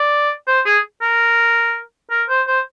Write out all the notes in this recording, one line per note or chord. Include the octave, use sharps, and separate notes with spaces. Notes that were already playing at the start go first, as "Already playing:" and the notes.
Already playing: D5
C5
G#4
A#4
A#4
C5
C5